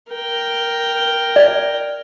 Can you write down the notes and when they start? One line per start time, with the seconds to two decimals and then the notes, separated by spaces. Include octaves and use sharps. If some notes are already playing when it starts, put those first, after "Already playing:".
0.11 A#4 G5
1.36 D5